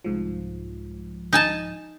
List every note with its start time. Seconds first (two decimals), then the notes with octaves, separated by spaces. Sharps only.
0.04 C2 G#2 F3
1.33 D#4 G#5 A5